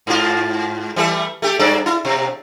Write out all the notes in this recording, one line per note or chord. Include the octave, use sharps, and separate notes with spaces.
G#2 F4
E3 G3 A3
A3 G4 A4
G2 A4 D5
E4
B2